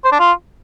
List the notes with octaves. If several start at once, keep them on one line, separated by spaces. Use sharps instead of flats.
C5
D4
F4